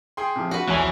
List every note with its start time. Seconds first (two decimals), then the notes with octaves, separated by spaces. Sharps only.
0.17 G#4 G5 C6
0.36 C3 F3
0.51 F#4 B4
0.68 B1 E2 E3 F3 G#5 F#6